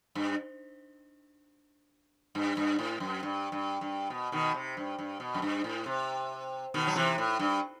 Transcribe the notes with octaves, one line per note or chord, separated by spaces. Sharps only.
G2
G2
G2
A2
F#2
G2
G2
G2
B2
B2 D#3
C3
G2
G2
B2
F#2
G2
A2
C3
B2 D#3
F#3
C3 E3
A2
G2